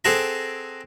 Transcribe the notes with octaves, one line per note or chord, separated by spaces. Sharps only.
C4 G#4 A4 F#5 A5 A#5